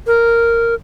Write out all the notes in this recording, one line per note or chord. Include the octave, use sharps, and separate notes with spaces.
A#4